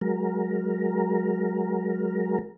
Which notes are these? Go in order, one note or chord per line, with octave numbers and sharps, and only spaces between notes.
F#3 G#3 A#4